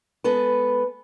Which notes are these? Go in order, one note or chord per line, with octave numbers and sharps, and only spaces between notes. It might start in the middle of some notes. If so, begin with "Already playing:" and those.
G#3 B3 A4 B4